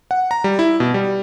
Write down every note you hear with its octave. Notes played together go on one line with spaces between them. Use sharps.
F#5
A#5
G3
E4
B2
G3